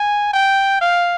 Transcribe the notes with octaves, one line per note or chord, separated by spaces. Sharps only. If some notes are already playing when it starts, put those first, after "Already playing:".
Already playing: G#5
G5
F5